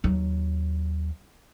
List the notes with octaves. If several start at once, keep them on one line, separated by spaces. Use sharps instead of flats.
D#2 F#3